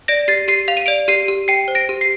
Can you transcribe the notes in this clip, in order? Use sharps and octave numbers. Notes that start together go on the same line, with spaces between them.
D5 A#6 D7
G4 A6 C7
G4 C7 D#7
F5 F7
D#7
D5 D7 F7
G4 C7 D#7
G4
G5 C7 D#7
C5
A#6 D7
G4
C7